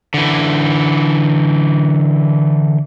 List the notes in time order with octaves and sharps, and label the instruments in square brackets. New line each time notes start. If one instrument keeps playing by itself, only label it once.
[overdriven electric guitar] D3 E3